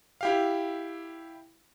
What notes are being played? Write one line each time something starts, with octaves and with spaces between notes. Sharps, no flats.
E4 G4 F5